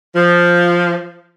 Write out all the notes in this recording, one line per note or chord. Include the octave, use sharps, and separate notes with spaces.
F3